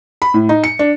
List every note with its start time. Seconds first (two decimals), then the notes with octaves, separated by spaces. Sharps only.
0.22 B5
0.34 A2
0.49 D#4
0.64 C#7
0.79 D4